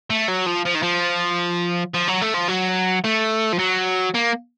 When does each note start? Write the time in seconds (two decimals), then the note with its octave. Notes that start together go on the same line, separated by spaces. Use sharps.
0.10 A3
0.28 F#3
0.46 F3
0.65 F3
0.74 D#3
0.83 F3
1.94 F3
2.08 F#3
2.22 A3
2.34 F3
2.48 F#3
3.04 A3
3.52 F3
3.59 F#3
4.14 A#3